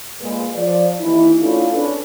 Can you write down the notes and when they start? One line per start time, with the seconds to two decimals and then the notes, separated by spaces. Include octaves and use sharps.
0.20 A#2 G#3 B4
0.55 F3 D5
1.00 D#2 E3 D#4 E4
1.42 A3 C#4 D4 E4 F4 A4
1.74 C#4 D4 A4 B4